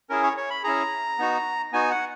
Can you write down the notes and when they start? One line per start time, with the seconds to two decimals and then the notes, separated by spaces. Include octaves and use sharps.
0.10 C#4 E4 G#4 A#4
0.23 C#5
0.37 C#5
0.50 B5
0.64 C#4 E4 G#4 A#5
1.18 B3 D#4 F#4
1.73 B3 D#4 F#4 G#5
1.91 F#5